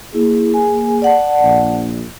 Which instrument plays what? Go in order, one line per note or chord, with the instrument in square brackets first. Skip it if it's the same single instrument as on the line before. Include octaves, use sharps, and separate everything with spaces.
[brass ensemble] A#3 G#4 [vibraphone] E4
[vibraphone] G#5
D5 F#5 A5
[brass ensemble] A#1